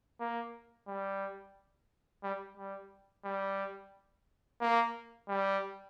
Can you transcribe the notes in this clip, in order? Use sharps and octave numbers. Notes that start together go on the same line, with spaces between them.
A#3
G3
G3
G3
G3
A#3
G3